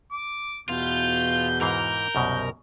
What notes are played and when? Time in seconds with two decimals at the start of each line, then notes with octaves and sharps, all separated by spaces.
0.12 D6
0.69 E2 B2 F4 G6
1.61 G#2 E3 A#4 F5 G6
2.15 C2 F#2 B2